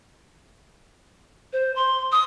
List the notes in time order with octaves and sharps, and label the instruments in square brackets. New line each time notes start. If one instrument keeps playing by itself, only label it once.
[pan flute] C5
C6
D#6